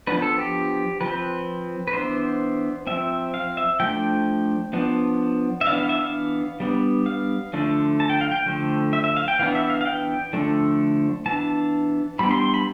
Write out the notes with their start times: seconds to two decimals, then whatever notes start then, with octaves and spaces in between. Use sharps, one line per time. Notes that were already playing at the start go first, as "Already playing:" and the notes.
0.07 F3 B3 D4 B4
0.22 A4
0.39 G4
1.01 F3 C4 B4
1.88 B4
1.93 E3 B3 D4 C5
2.87 F3 C4 E5
3.34 F5
3.57 E5
3.80 F3 A3 D4 G5
4.73 F3 B3 D4
5.61 E5
5.66 E3 B3 D4 F5
5.78 F5
5.89 E5
6.01 F5
6.60 G3 B3 D4
7.06 F5
7.53 D3 F3 A3 D4
8.00 A5
8.10 G5
8.21 F5
8.31 G5
8.46 D3 F3 A3
8.93 E5
9.04 E5
9.17 F5
9.28 G5
9.39 E3 B3 D4 F5
9.55 E5
9.70 F5
9.81 F5
9.85 G5
10.33 D3 F3 A3 D4
11.26 E3 B3 D4 A5
12.19 E3 G3 B3 D4 B5
12.31 C6
12.42 C6
12.54 B5